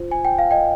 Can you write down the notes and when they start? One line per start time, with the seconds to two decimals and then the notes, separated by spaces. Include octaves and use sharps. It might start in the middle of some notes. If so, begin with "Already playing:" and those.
Already playing: F4 C5
0.11 G#5
0.25 G5
0.38 F5
0.51 D#5 G5